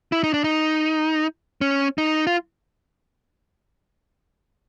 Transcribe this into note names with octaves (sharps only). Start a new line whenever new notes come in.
E4
D#4
D4
D#4
C#4
D#4
F4